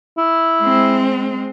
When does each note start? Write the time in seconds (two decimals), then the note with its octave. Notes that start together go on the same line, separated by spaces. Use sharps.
0.18 E4
0.62 G#3 C4